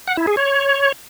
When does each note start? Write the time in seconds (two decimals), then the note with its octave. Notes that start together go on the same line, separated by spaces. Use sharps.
0.07 F#5
0.17 E4
0.27 G#4
0.37 C#5